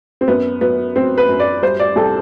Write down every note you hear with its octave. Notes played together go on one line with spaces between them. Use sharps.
C4
F#2 B3
F#3 B3
F#3 C4
B4
F#2
D5
G3 C5
D5
C2 A4